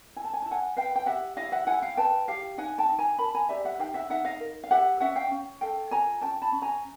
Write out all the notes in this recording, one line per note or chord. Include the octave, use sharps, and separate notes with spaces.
E4 G#5
A5
G#5
E4 A5
F#5 G#5
B4 F5 G5
G5
G4 E5 F#5
E4 D#5 F5
E5 F#5
E4 F#5 G#5
F5 G5
B4 G5 A5
G4 F5 G5
D#4 F#5 G#5
G5 A5
D#4
G#5 A#5
A#4 A5 B5
G#5 A#5
G4 D5 E5
E5 F#5
D#4 F5 G5
E5 F#5
D#4 E5 F#5
D#5 F5
A#4
F5
G4 E5 F#5
C#4 E5 F#5
F5 G5
C#4
A4 F5 G5
F4 G#5 A#5
C#4 G5 A5
A5 B5
C#4
G#5 A#5